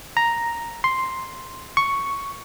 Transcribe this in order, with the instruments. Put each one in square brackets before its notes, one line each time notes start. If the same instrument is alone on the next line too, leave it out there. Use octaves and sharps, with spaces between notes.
[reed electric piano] A#5
C6
C#6